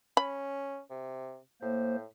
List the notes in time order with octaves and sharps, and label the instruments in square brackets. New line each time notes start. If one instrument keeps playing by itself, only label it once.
[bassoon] C#4 [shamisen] B5
[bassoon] C3
[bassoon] A2 [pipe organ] A#3 C5